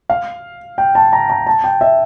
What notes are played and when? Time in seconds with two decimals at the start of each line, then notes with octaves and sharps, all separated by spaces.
0.10 F5
0.78 G5
0.95 A5
1.13 A#5
1.30 A#5
1.47 A5
1.64 G5
1.81 E5